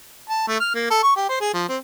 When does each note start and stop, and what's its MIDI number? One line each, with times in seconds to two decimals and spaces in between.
0.30 0.47 81
0.48 0.59 57
0.60 0.74 89
0.75 0.90 58
0.90 1.00 69
1.03 1.14 85
1.16 1.26 67
1.29 1.36 72
1.41 1.51 68
1.54 1.64 53
1.68 1.78 60